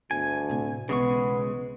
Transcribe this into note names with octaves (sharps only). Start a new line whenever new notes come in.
G1 D2 D#3 G#5
A2 C3
B1 C#3 E3 G#3 B3 C#6